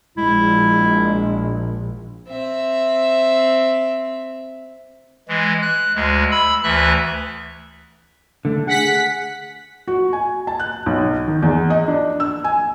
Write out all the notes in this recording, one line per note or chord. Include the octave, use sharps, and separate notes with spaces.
A#1 G#3 E4
C4 E5
E3 G#3
F#6
D2 G#3
B5 E6
D2 E3 E5 F#6
D3 A3
G#4 F#5 B6
F#4
G#5
A5
F#6
B1
D#3
E2
D#5
D4
E6
G#5